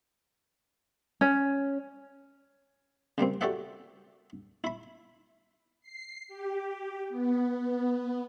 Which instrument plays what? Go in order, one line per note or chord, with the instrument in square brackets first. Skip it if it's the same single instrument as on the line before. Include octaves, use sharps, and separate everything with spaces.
[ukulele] C#4
[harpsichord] C#3 G3 A#3 C4
F#4 G4 A4 D5 E5 F#5
E4 B5
[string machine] C7
G4
B3